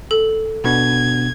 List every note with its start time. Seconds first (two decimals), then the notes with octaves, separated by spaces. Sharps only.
0.11 A4
0.64 B2 B3 D4 G#6